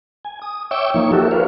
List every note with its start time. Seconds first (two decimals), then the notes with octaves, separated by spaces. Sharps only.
0.25 G#5
0.42 D#6
0.71 C#5 E5 G5 C#6 D6 E6
0.94 F3 A#3 D#4 C#5 C#6
1.12 F#4 G4 A4 A#4 E5
1.31 F4 B4 C#5 F5